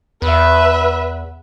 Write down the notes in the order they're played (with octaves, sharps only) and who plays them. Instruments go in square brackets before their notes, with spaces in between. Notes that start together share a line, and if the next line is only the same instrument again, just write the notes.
[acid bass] E2 [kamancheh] B4 E5